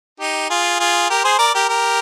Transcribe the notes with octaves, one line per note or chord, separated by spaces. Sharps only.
D#4 G4
F4 G#4
F4 G#4
G4 A#4
G#4 C5
A#4 D5
G4 A#4
G4 A#4